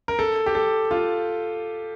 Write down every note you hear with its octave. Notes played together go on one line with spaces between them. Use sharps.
A#4
A4
G4
A4
F4